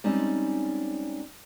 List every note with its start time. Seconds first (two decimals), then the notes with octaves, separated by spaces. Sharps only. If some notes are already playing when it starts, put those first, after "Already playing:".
0.04 G3 G#3 C4 C#4 D#4 D5